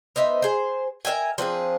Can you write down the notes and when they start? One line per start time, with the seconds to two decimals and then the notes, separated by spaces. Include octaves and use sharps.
0.16 B3 D#4 C5 E5
0.42 G#4 C5
1.05 A#4 E5 G5 G#5
1.38 F3 C4 D4 G#4